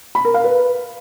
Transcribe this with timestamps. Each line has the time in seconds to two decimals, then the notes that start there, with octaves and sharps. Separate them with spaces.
0.15 B5
0.25 A#4
0.34 F5
0.44 B4